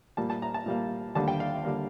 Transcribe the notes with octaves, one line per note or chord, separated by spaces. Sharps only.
A#2 G3 A#3 A5
A5
A#5
A5
A#2 G3 A#3
D#2 D3 G3 A#3 A5
G5
F5
D3 G3 A#3